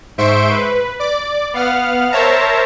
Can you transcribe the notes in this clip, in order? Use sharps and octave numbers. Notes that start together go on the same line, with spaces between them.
G#2 C5 E5 C6 C#6 D7
B4
D5 D6
B3 F5 F#5 F6
A#4 C5 C#5 E5 A5 A#5